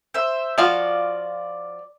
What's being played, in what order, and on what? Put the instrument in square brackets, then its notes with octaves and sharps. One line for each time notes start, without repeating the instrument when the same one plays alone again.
[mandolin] C5 E5
[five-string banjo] F3 F4 F#4 [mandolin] D5